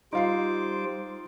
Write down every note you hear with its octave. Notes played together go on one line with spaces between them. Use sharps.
G3 D#4 F4 C5 D6 C7